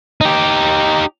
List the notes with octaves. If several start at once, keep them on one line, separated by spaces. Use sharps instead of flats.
D#4 G4